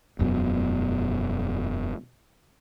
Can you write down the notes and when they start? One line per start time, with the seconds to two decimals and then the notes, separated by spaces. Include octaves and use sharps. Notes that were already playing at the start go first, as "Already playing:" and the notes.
0.19 E1 F#2 B2